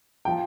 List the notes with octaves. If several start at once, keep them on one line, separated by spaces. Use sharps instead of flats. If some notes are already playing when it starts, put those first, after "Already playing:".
F3 G5